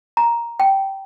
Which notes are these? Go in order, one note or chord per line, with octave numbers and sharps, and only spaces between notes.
A#5
G5